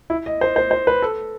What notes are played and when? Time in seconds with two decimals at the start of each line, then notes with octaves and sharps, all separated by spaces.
0.10 E4
0.26 D#5
0.41 C5
0.56 C5
0.71 C5
0.87 B4
1.02 A4